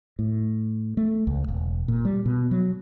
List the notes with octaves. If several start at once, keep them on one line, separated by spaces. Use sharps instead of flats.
A2
A3
C#2
E1
A#2
G3
B2
F#3